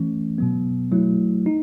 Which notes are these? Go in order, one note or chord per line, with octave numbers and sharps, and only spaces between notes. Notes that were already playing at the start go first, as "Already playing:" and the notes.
Already playing: E3 A3 C#4
B2 F#3 B3
F#3 A3 E4
D#4